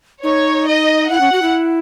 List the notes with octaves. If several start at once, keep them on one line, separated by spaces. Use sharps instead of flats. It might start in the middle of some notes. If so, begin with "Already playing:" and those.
D#4 C#5
D#5
E4 F#5
C#4
F#4
E4